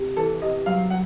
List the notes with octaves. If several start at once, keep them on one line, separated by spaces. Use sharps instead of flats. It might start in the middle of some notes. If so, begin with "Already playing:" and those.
Already playing: C3
E3 A4
C3 D#5
F#3 F5
F#3 F#5